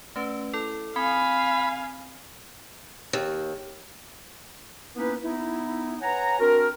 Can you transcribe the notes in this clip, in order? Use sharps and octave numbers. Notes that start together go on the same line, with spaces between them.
A3 C#4 B4
E4 A4
C4 F5 G#5 B5
D#2
A#3 B3 C#4 D#4 E4 B4
B3 D#4 E4
B4 C#5 F#5 G#5 A#5
C4 D4 F#4 A#4